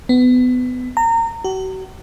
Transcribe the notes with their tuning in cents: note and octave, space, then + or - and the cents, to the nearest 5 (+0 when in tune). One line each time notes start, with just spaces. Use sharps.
B3 +25
A#5 -30
F#4 +40